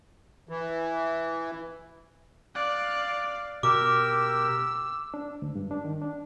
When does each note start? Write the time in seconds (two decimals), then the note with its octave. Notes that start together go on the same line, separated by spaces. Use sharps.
0.49 E3
2.55 D5 F5 F#6
3.63 B2 G4 A#4 D6 E6
5.14 D4
5.42 D2
5.55 G2
5.71 D4
5.84 D#3
6.01 D4